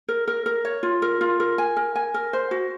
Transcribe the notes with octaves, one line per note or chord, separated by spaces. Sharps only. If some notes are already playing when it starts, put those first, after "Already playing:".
A#4
A#4
A#4
C#5
F4
A#4
F4
A#4
G#5
A#4
G#5
A#4
C5
F#4